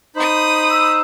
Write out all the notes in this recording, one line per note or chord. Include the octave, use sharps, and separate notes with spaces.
D#4 C5 B5 D#6
E6